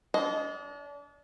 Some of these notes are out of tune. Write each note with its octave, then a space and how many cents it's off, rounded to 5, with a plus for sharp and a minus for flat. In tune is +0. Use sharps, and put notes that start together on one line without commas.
D4 -35 D#5 +0